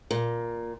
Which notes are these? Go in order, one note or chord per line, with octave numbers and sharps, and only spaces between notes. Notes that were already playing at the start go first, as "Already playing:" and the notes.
A#2